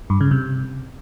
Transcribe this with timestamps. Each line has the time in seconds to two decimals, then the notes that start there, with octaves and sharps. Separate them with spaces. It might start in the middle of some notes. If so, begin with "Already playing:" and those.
0.10 G2
0.21 C#3
0.31 C3